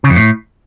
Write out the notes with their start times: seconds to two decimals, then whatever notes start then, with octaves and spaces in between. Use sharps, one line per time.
0.04 C#3
0.10 F2
0.16 A2